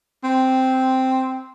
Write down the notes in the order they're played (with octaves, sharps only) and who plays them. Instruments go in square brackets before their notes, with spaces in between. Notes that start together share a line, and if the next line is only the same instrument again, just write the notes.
[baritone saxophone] C4